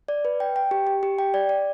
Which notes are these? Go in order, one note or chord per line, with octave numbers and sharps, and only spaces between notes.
D5
B4
G5
G5
G4
G4
G4
G5
D5
D5